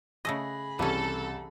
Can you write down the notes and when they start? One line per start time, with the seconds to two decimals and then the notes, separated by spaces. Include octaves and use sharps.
0.25 C#3 A3 G#4 D#5 B5 A#6
0.79 C2 E3 C#4 A4